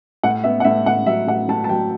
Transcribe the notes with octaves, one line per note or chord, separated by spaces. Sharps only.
A2 F#5
B3 E5
F#5
A2 E5
A2 F#5
F#3 E5
A2 F#5
A2 A5
A5
F#3 G5